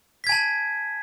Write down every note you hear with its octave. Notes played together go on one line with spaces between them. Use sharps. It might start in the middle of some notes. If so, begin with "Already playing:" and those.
G#5 A5 G#6 B6